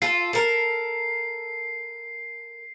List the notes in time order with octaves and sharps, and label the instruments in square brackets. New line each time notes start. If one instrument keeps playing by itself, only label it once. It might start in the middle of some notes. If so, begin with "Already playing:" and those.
[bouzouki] F4 A4 [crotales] C7
[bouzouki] A4 A#4